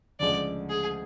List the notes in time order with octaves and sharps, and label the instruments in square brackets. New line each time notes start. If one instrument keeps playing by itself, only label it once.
[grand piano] D2 C#3 F3 G#3 [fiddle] D5
[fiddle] G#4